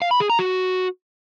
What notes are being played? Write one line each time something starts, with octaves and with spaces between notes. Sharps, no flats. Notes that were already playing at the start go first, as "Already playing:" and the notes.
F5
B5
G#4
A#5
F#4